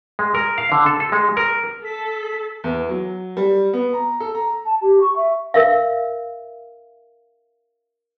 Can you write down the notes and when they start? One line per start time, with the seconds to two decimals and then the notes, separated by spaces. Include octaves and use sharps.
0.19 G#3
0.35 A#4
0.58 F5
0.72 D3
0.86 A4
1.00 A4
1.12 G#3
1.37 A#4
1.84 A4 B6
2.64 E2
2.89 F#3
3.37 G3
3.73 B3
3.93 A#5
4.20 A4
4.35 A#5
4.65 A5
4.81 G4
5.00 C#6
5.16 E5
5.54 A#4 E5 F5